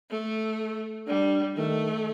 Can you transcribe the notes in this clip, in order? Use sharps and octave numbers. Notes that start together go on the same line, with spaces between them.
A3
G3 D4
D#3 A3